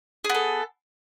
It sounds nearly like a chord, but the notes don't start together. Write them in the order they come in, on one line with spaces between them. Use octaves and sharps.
G#4 B3 A4